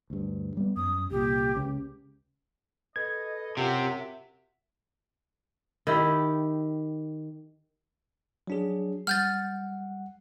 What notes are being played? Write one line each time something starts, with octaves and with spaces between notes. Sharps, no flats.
D2 G2
G3 B3
F#2 D#6
C2 A#2 G4
C#2 C#3
A4 B4 D#5 G#6
F#2 C3 F4 G4 E5 F#5
D#3 E4 G4
F#3 D4 G#4
G3 F#5 F6 G6 A6